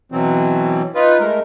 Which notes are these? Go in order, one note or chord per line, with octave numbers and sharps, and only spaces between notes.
B2 E3 F#3 C4
D#4 F4 B4
G#3 A3 A#4